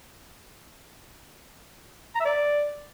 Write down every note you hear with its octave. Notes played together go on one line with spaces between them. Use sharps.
A#5
E5
D5